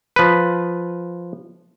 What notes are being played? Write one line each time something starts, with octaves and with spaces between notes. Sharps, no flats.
F3 B4